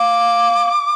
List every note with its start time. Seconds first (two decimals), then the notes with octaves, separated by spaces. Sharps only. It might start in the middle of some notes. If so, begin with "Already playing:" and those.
Already playing: F5 D6